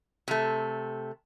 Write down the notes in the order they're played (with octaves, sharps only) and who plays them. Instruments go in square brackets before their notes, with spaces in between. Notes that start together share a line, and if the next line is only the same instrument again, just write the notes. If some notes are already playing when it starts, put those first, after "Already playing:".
[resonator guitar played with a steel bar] C3 A3